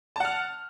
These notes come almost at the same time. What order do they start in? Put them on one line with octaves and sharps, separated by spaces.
A5 F#5 F6